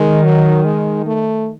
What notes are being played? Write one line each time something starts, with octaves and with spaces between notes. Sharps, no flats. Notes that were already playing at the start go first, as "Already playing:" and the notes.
Already playing: D#3 G#3
F#3
G#3
A3